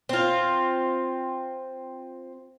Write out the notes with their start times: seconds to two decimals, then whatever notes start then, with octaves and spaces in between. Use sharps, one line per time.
0.09 C4 F4